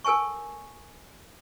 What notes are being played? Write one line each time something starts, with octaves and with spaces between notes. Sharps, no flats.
A4 A#4 G#5 A5 C#6